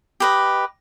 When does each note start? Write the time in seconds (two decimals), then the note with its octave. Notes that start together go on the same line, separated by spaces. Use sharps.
0.20 G4 B4 D#5